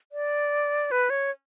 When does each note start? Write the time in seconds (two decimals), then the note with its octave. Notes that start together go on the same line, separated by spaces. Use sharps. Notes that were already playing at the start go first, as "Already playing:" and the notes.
0.12 D5
0.91 B4
1.10 C#5